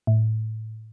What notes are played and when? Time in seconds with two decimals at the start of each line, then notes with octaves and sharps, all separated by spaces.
0.07 A2